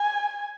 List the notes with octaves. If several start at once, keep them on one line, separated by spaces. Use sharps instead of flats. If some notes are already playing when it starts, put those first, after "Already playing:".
Already playing: G#5